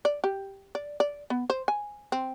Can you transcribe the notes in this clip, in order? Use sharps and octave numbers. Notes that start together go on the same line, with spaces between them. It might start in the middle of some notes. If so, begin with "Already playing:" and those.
D5
G4
D5
D5
B3
C5
G#5
C4